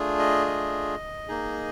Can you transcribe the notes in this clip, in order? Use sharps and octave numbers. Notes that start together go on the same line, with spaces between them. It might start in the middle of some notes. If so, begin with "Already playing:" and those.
Already playing: A3 D4 F4 G#4
D#5
D#5
A#3 D#4 G#4